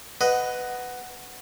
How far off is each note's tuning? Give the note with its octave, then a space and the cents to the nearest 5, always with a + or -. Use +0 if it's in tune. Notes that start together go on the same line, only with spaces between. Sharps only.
B4 +10 D#5 +0 F#5 +0